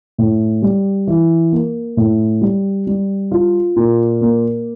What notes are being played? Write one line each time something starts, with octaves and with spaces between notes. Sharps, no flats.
A2
G3
E3
A#3
A2
G3
G3
F4
A#2
A#3